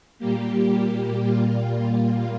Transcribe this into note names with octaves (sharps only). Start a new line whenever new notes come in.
A#2 G3 A#3 G4
A#2 G3 A#3 F4
F4